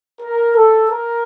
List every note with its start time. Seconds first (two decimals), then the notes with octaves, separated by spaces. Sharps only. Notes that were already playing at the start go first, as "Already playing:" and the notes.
0.21 A#4
0.56 A4
0.90 A#4